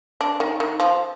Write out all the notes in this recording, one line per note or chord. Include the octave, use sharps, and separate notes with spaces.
D4
D#3
D#3
F3